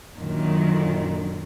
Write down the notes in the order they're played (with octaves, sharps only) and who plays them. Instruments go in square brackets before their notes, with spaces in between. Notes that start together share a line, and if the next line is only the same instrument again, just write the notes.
[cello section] F#2 A#2 D3 D#3 F#3